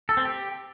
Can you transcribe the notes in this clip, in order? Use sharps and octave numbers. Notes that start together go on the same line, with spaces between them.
A4
C4
G4